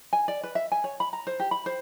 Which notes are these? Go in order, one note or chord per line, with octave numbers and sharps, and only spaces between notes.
G#5
D5
B4
E5
G#5
C#5
B5
A#5
C5
G4
B5
C5